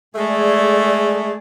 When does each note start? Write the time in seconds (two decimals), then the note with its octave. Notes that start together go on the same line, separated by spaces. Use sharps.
0.16 G#3 A3 G#4 D5